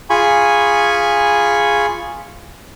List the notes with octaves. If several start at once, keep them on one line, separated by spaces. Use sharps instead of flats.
F4 G#4 G#5 B5 C#6